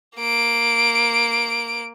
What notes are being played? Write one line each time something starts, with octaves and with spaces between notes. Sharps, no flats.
A#3 D7